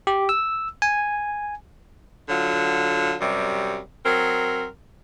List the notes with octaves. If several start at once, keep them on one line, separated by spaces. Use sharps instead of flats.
G4
E6
G#5
D3 F#3 F4
F#2 C3 G3
F#3 C4 A#4